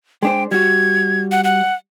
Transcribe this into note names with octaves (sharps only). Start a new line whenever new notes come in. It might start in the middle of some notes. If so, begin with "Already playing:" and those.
G#3 D4 C5 G5
G3 F#4 G#6
F#5
F#5